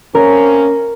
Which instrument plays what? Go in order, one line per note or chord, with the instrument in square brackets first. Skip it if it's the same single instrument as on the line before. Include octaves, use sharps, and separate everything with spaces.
[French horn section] A#3 C4 C#4 [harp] A#4